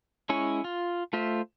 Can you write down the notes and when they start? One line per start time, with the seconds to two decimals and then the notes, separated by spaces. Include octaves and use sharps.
0.29 G#3 C#4 E4 C#5 G#5
0.64 F4
1.13 A3 F4 C5 E5